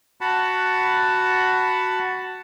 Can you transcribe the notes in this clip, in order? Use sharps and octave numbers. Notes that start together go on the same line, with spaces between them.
F#4 F#5 A5 B5